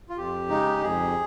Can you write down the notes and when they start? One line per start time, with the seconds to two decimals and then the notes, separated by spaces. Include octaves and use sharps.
0.09 F4
0.17 F2 G4
0.49 C#3 G#3 D#4
0.82 F2 G#4